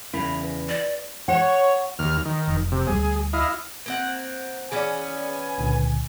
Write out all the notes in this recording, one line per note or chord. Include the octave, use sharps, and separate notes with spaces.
E2 C#3 E4 A#4 B5 F7
B4
D5
C#5 F#5
D#2 F6
D#3
F1
C3
D2 G3 B3 G#4
E4 D#5 F5
A#3 C4 F#5
E3 B3 C#4 G#4 D5 G#5
C#2 A#2 D3